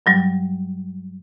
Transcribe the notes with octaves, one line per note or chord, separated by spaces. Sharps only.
G2 F#3 G3